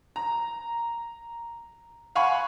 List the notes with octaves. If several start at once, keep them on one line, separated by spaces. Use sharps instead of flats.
A#5
F5 F#5 G#5 B5 C#6